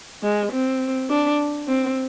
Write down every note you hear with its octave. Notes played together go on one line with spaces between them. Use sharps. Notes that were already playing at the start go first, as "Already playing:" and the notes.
G#3
C4
D4
C4